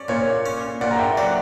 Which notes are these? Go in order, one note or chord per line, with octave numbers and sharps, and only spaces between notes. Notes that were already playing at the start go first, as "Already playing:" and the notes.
Already playing: C#4 D5
A#2 C#5
C#4
A#2 D5 F#5
A#5
E5 G5
F#3 D5 F#5